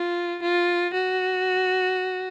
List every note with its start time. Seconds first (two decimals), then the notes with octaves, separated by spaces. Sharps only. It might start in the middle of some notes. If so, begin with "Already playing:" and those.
Already playing: F4
0.43 F4
0.94 F#4